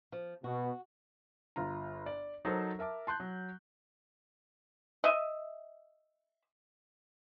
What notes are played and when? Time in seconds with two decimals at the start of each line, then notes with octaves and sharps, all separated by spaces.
0.12 F3
0.44 B2 F#4
1.56 G1 F4 A#5
2.06 D5
2.45 F#3 D#4 A4 A#4 C5
2.79 A#4 E5 A5 D6
3.07 A5 C6 F#6 G6
3.20 F#3
5.04 D#5 E5